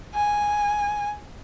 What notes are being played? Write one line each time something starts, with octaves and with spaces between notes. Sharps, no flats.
G#5